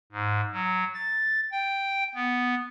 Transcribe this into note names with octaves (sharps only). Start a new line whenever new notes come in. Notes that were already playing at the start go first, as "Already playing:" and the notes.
G#2
F#3
A6
G5
B3